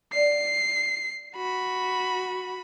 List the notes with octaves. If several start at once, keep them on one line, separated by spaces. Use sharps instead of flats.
D5 F5 F#5 C7
F#4 B5